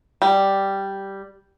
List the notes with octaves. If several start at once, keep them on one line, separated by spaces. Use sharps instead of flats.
G3